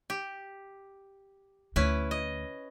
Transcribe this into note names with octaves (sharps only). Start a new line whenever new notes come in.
G4
D2 A3 C#4 E4 B4
D#5